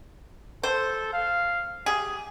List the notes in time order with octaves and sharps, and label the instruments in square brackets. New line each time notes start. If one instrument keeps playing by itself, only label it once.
[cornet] A4 [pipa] C5
[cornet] F5
[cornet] G4 [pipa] G#4